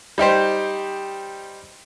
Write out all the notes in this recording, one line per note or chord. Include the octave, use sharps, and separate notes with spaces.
G3 D#4 G4 C5